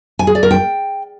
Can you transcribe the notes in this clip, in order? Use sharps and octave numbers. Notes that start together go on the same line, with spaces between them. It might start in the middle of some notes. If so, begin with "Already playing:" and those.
G#5
G#4
D5
A#4
G5